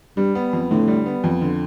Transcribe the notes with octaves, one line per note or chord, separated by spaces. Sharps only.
G2 G3
B3
F2
A2 D3
G3
B3
F2
D3